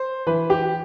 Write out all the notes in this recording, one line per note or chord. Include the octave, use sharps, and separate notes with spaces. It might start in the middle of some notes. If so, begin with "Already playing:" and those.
Already playing: C5
E3 B4
G4